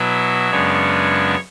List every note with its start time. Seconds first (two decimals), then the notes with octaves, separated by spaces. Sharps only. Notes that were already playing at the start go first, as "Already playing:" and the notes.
Already playing: B2 F#3 B3 E4 E5
0.50 F#2 C#3 G#3 B3 D4 C#5